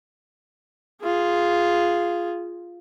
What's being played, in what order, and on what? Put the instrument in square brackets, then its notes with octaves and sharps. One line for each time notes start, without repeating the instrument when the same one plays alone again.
[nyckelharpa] F4 G#4